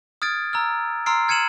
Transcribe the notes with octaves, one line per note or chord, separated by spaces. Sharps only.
D#6 F6 G#6 A6 D7
A#5 E6 F6
A#5 C6 E6 F6 C7 D7
F6 G#6 C#7 D#7 E7 F#7